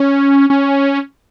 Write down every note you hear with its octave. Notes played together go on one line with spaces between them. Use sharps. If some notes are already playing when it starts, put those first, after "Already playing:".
Already playing: C#4
C#4